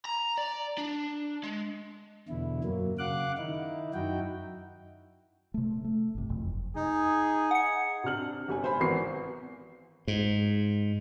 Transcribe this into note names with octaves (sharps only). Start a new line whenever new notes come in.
A#5
D5
D4
G#3
E2 B2 D3 E4
F#2 F#3 A#3
C#3 F5 F#5 D6 F#6
D#3 D#4 E4
F#2 D#4 E4 F#4 G5
C3 A3
A3
G1 C3
F#1 F2
D#4 G#4
F#5 C#7
C3 D4 F6 F#7
G1 G3 G#5
C5 G#5 B5
G#1 E3 B3 A#4 C#6 C7
G#2